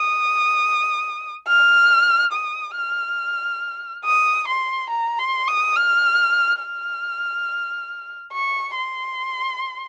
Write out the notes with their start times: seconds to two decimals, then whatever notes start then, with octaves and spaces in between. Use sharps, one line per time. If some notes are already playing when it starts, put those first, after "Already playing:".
Already playing: D#6
1.48 F6
2.33 D#6
2.76 F6
4.05 D#6
4.48 C6
4.90 A#5
5.19 C6
5.48 D#6
5.76 F6
6.62 F6
8.33 C#6
8.76 C6